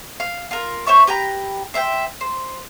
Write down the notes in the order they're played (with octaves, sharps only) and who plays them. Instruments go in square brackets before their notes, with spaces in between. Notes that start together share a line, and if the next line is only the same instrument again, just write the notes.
[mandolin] F5
F4 A#4
C5 C#5 E5 C#6
G4 B4 G5 A#5
C5 E5 F5 G5
C5